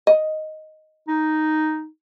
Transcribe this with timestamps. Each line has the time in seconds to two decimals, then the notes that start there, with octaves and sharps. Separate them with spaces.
0.07 D#5
1.08 D#4